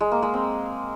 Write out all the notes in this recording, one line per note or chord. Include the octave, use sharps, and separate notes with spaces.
G#3
A#3
G#3
C4